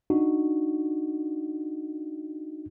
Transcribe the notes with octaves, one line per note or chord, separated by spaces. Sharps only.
D4 D#4 F#4